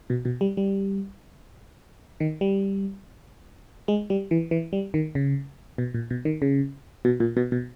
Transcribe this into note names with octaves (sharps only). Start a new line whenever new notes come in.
B2
B2
G3
G3
D#3
G3
G#3
G3
E3
E3
G3
D#3
C#3
B2
A#2
B2
D#3
C#3
B2
A#2
B2
B2